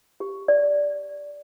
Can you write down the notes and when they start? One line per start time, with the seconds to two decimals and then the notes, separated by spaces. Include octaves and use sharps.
0.20 G4
0.48 D5